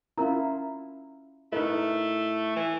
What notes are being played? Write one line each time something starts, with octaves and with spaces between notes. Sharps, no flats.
C#4 E4 F4 A#4 A#5
A2 A3 D#4 A#4 B4 D#5
E3